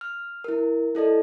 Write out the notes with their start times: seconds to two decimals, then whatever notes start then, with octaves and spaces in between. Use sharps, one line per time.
0.01 F6
0.44 E4 A#4
0.95 E4 A4 D5 D#5